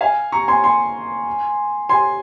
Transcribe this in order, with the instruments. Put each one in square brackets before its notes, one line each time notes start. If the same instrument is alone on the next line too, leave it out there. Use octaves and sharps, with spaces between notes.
[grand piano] F5 G#5
A#5 C#6
G#5 C6
G#5 C6
G#5 C6